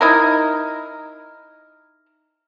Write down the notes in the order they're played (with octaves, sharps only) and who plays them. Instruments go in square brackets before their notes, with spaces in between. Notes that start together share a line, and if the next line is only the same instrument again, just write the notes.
[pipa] D#4 E4 A#4